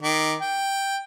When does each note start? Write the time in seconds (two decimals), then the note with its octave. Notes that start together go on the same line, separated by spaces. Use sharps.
0.02 D#3 D6
0.40 G5